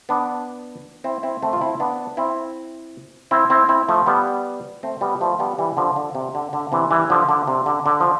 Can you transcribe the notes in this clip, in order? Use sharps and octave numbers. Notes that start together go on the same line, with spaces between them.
B3 D4
C4 E4
C4 E4
A3 C4
F4
C4 E4
B3 D4
C4 E4
C4 E4
C4 E4
C4 E4
F3 A3
G3 B3
A3 C4
G3 B3
F3 A3
G3 B3
E3 G3
D3 F3
D3
C3
D3
D3
C3 E3
E3 G3
D3 F3
D3
C3
D3
D3
F3